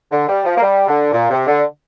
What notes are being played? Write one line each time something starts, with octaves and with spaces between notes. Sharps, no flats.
D3
G3
F3
A#3
G3
D3
A#2
C3
D3